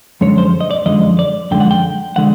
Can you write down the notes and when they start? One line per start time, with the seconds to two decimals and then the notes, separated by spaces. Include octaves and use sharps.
0.21 F#2 D3 F3 G#3 C#5
0.38 C5
0.61 D#5
0.71 D5
0.86 F#2 D3 F3 G#3 D#5
1.19 D5
1.51 F#2 D3 F3 G#3 G5
1.60 F#5
1.71 G5
2.16 D3 F3 G#3 F#5